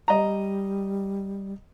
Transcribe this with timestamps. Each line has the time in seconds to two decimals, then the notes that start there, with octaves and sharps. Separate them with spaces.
0.08 G3 D#5 A#5